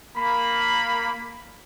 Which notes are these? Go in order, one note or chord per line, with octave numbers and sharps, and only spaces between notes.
A#3 B5